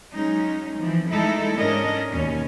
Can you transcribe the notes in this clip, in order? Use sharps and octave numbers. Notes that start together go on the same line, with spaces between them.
F#3 G#3 C#4 D#4
E3 F3 C4
G#3 A3 D#4 E4 A4
G#2 G#3 C#4 D4 A#4 D#5
D#2 B2 C#4